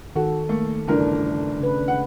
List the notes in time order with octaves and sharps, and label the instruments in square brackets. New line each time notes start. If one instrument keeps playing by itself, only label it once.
[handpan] D#3 A4 [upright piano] F#4
[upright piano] A3 A#3
[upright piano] G1 E3 A#4 [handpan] C#3 A3 D4
[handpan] C#3 B4
[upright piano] F#5